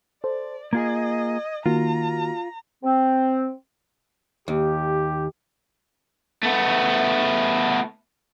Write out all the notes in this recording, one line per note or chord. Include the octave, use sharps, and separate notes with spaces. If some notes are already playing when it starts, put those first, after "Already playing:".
A4 C5 D5
A#3 F4 G#4 D#5 G#6
D#3 A#3 F4 F#4 A#5
C4
D#2 G4
A3 B3